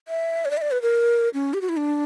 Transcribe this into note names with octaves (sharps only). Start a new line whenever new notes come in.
E5
C#5
D5
E5
D5
B4
A#4
C#4
G4
F#4
E4
D4